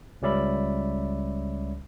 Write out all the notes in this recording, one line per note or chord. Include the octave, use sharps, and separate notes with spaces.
C#2 G3 C#4 D5 E5 B5